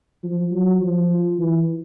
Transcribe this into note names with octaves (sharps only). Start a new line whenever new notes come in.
F3
F#3
F3
E3